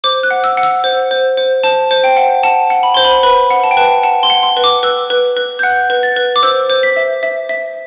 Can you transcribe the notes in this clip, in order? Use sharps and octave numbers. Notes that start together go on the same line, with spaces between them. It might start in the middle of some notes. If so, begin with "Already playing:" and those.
C5 D6
F#6
F#5
E6
F#5
E6
C5
C5
C5
C5 A5
C5
G5
F#5
F#5 A5
F#5
B5
C5 C6
B5
B4 B5
F#5
A5
G5
B4 A5
F#5 A5
C6
F#5
C6
B4
D6
B4 E6
B4
B4
G6
F#5 F#6
B4
A6
B4
D6
C5 E6
C5
B6
E5
E5
E5